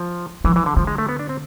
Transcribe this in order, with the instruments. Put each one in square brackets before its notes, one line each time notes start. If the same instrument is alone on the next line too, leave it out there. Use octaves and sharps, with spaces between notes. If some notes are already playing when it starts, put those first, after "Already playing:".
Already playing: [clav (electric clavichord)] F3
[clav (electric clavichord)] E3 [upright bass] F3
[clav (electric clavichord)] E3
D3
[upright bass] D3 [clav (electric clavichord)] F3
[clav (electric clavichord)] G#3
A3
B3
D4
C4